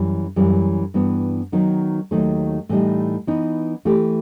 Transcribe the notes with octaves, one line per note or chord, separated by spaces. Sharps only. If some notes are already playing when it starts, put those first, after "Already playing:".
Already playing: F#2 E3 G3
F#2 E3 G3
G2 E3 B3
D#3 F#3 B3 D#4
D#2 D#3 F#3 A3 D#4
A2 E3 G3 D#4
E3 B3 D#4
E3 A3 E4 G4